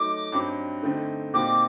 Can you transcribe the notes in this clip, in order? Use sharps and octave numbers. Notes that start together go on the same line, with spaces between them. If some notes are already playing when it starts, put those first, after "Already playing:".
Already playing: F#3 A3 D#4 D6
G2 F#3 C4 D#4
D3 A3 C4 D#4
A#2 G3 C4 D#4 F#4 D6